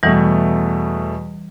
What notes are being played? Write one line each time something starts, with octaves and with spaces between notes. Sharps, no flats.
E2 B2 E3 G3 A3